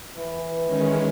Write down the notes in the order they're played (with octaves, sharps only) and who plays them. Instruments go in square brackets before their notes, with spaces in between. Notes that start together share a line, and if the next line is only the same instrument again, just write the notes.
[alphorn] E3
[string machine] D#3 G#3 C#4